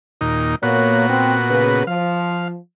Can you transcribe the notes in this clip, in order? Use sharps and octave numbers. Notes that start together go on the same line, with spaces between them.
D#2 A#2 D#4
A#2 A#3 B3 F#4 C#5
C4
C#3 B4
F3 F5